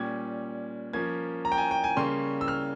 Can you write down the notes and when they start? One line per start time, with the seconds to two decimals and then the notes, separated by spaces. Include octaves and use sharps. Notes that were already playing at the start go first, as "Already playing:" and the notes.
Already playing: A#2 G3 C#4 G#6
0.93 F3 A#3 C#4 G#6
1.45 A#5
1.52 G5
1.58 G#5
1.71 G5
1.84 G#5
1.97 C#3 G3 A#3 C#4 C6
2.41 E6
2.48 F6